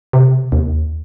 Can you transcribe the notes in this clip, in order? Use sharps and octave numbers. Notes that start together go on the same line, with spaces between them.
C3
D#2